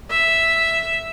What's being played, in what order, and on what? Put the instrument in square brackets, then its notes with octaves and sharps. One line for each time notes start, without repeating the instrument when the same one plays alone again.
[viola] E5